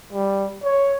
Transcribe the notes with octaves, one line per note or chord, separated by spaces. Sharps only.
G3
C#5